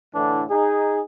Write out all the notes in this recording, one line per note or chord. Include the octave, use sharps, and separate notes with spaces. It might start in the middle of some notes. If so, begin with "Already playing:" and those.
A2 D3 E3 D4
D#4 G#4